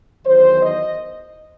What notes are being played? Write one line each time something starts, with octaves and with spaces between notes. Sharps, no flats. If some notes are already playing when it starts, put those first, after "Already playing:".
E2 D#3 F#3 C5
D#5